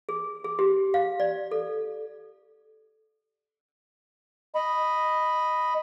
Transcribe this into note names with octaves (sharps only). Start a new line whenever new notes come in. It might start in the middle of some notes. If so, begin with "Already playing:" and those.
G#4
G#4
G4
F5
D5
A4
D#5 B5